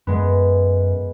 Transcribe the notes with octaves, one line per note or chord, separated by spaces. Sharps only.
F#2 G#3 B3